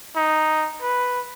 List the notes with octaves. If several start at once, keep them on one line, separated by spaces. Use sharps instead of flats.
D#4
B4